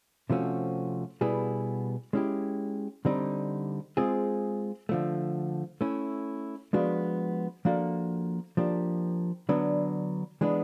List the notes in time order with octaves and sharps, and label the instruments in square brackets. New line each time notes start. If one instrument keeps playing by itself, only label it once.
[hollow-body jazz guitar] C3 F3 A3 C#4 F#4
B2 G3 B3 E4 G#4
G#3 C#4 E4 G4
D3 G3 C4 D#4
G#3 C4 F4 G#4
D3 F3 A3
A3 C#4 E4
F3 G#3 B3 D4 F#4
F3 A#3 D4 F#4 A4
F3 A#3 D4 G4
D3 F#3 B3 D4
E3 G#3 B3 D4